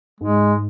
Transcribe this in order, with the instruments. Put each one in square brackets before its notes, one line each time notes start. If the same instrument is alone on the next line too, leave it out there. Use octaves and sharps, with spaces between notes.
[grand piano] G#2 [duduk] G#3